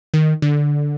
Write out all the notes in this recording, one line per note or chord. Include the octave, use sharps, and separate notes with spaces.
D#3
D3